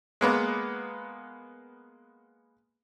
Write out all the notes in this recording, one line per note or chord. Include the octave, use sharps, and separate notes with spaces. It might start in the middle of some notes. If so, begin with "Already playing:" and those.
G#3 A#3 B3